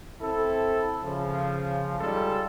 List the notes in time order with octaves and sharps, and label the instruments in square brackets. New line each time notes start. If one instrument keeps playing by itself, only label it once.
[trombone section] C4 E4 A4
C#3 F3
G3 G#3 D#4 F4 A4